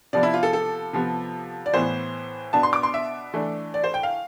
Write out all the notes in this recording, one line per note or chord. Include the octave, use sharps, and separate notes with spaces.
C3 F3 B3 D5
E4
F4
A4
A4
C3 F3 B3
D5
A2 E3 B3 C5
B2 B3 D4 A5
C6
D6
C6
E5
E3 A3 D4
D5
C5
G5
F5